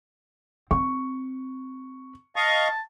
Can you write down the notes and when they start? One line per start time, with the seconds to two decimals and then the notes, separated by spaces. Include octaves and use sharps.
0.71 C4 C#6
2.36 D#5 F5 A5 C#6